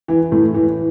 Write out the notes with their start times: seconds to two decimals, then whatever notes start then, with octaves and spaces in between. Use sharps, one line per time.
0.08 E3
0.32 A2
0.54 E3